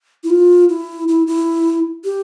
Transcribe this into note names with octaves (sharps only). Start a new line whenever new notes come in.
E4
F4
E4
E4
E4
G4